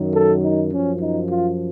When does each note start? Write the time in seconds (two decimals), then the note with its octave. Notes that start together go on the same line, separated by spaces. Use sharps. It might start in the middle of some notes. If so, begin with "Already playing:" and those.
Already playing: F#2 D#3 F#3
0.14 A4
0.43 D#4
0.72 F#2 F3 C#4
1.01 D#4
1.30 F4